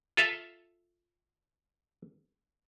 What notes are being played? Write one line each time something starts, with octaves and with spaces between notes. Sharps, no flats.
F4 A4 E5 F5